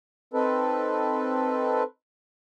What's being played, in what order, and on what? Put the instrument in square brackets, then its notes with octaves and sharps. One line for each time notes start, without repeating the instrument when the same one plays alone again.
[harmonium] C4 D#4 A4 B4